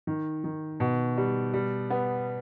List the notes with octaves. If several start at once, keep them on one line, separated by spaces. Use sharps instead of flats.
D#3
D#3
B2
G3
G3
B3